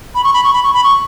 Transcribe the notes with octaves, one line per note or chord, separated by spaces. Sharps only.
B5
C#6
B5
C#6
B5
C#6
B5
C#6